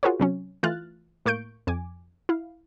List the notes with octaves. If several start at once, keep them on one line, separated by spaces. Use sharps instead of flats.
F4 F#4 G#4 A#4 C5 C#5
C3 F#3 C#4
E3 A3 F4 F6 F#6 A6
A2 A#3 C#6 G6 D7
F2 G#5 D6
E4 F5